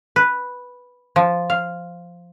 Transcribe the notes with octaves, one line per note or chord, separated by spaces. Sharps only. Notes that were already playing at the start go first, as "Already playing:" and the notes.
B4
F3
F5